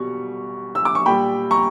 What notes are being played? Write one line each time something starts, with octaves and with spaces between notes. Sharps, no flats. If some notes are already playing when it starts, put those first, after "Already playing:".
Already playing: B2 G3 C#6
E6
D6
C#6
A#2 G3 G5 B5
A#5 C#6